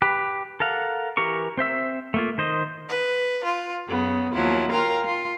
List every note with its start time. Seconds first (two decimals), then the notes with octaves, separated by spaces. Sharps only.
0.02 G4 B4
0.60 A4 A#4 F5 F#5
1.17 E3 G4 A#4 C#6
1.58 C4 C5 E5 E6
2.14 A3 A#3 F4
2.38 D#3 C5 D#5
2.88 B4
3.44 F4
3.88 F#2 C#3 B3
4.34 D#2 F3 F#3 E4
4.71 F4 A#4 F5 G5
5.05 F4